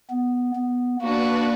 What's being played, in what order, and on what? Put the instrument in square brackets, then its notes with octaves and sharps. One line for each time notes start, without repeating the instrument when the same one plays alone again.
[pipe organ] B3
B3
[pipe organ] A#3 [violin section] D4 F#4 B4